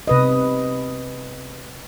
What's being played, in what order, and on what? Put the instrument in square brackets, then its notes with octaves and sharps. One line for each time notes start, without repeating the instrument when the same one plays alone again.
[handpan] C3 B4 D#5